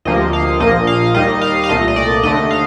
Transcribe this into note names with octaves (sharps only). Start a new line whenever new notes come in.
D2 C3 F3 A#3 D#5
F5
A#1 A#2 F3 A#3 D#5
F5
D#2 D#3 G3 D#5
F5
F5
C2 A#2 A3 D#5
D#5
D5
D#2 D3 A3 D#5
F5